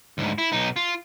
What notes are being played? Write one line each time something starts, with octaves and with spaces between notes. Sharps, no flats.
D2 G#2
E4
B1 D#4
F4